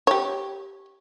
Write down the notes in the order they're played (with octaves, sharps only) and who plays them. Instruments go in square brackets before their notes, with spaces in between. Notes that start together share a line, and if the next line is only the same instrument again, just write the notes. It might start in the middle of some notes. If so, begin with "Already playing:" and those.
[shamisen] G4 C#5